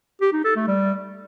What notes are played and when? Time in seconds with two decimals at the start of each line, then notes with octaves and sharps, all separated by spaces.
0.21 G4
0.33 D#4
0.44 A4
0.56 A3
0.67 G3